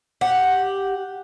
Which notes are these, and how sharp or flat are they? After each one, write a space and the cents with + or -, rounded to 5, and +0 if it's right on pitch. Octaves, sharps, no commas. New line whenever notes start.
G4 +0 F#5 +0